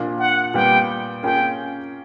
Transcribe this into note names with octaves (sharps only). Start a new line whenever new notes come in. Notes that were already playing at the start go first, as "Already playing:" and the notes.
Already playing: A#2 F3 A#3 D4 F4
F#5
A#2 G3 B3 G5
A#3 C#4 F4 G#4 G5